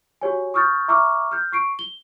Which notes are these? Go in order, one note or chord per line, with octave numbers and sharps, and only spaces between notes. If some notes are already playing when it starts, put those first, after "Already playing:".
F#4 G4 C#5 G#5
C#6 D#6 F6 G6 A6
E5 A#5 C#6 D6 E6 F6
F6 G6
C#6 C7 D7
G7